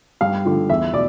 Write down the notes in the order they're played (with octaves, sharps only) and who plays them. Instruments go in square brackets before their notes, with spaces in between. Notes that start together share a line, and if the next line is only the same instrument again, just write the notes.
[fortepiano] G2 F5
D3 F3
E2 E5
B2 D5